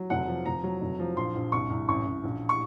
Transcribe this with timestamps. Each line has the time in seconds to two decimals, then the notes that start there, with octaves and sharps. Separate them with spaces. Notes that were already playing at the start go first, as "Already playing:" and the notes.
Already playing: F#3
0.10 F1 F#5
0.27 F3
0.45 F1 A#5
0.64 F#3
0.82 F1
1.00 F3
1.17 A#1 C6
1.35 A#1
1.52 C2 C#6
1.70 C2
1.88 A1 C#6
2.06 A1
2.24 A#1
2.49 C#6